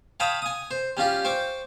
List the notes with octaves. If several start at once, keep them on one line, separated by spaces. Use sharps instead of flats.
C#5 F5 G5 A5 B5 D#6
G#5 D#6
C5
G3 C#4 F4 G4
C5 G5 C#6 D6